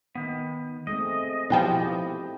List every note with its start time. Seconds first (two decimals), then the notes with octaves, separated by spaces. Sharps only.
0.15 D#3 B3
0.87 G#3 A3 C4 D#5
1.50 G#2 B2 F3 E4 G4 G5